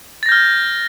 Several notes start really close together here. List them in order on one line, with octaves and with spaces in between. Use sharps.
A6 A#6 G6 F6